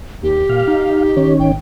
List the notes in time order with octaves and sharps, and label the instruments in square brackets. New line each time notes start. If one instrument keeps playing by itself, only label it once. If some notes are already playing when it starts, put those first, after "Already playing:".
[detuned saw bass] D#2 [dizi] G4
[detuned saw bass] A#2 [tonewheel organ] F5
[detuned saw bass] D#4
[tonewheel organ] D#3 C#4
[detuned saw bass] G#1 [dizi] G5